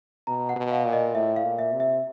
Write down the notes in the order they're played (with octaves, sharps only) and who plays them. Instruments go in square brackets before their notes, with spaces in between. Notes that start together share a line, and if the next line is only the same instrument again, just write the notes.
[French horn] B2 [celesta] A#5
[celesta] F#5
[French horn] B2
[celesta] F5
[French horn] A#2
[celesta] D#5
[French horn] A2 [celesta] E5
[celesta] F5
[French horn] A#2
[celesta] E5
[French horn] C3
[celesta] E5